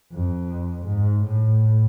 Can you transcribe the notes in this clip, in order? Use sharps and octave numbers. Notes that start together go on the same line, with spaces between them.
F2
G#2
A2